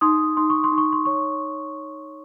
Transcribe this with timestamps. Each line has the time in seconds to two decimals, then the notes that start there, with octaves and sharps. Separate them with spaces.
0.01 D#4 C6 D#6
0.37 D#4 C6
0.50 C#6
0.64 C6
0.72 D#4
0.78 C#6
0.93 C6
1.05 C#5 C#6